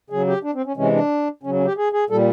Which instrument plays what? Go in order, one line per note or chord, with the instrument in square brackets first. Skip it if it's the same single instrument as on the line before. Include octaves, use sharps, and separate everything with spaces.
[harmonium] C#3 F#3 G#4
G4
D4
C4
C#4
C3 E3 G#3 C#4
D4
C#3 C#4
F#3
C#4
G4
G#4
G#4
A#2 G3 A4